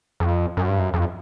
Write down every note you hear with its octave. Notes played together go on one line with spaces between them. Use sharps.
F2
F#2
G2
F#2
F2